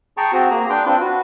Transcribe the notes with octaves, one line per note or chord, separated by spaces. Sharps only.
G#4 G5 A5 A#5 C#6
C4 F#4
A#3 G#4 A#5
D4 B4 G5 C6
C4 D4 F4
F#4 B4